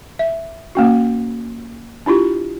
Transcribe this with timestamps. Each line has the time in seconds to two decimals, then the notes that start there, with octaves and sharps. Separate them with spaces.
0.19 E5
0.75 A#3 C#4 F#4
2.06 D4 E4 F4 G4